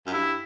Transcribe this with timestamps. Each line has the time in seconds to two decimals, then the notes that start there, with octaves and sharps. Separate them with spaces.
0.07 F#2
0.12 G2 E4